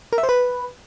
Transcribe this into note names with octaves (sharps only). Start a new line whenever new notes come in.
A#4
E5
C5
B4